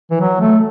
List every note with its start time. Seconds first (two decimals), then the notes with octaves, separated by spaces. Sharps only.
0.11 E3
0.20 F#3
0.40 A3